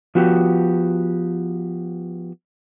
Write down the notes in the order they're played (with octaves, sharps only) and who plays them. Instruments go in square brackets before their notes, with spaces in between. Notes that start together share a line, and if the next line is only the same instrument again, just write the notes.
[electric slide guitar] F3 B3 F#4 G4